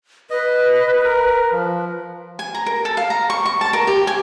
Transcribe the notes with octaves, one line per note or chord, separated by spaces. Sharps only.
B4 D#5
A#4
F3
G#5
A#5
A#4
A4
F5
A#5
C#6
C#6
A5
A#4
G4
G#5